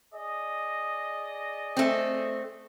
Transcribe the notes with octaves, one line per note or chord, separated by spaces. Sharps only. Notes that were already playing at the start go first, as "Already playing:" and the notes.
G#4 D5 D#5
A3 C4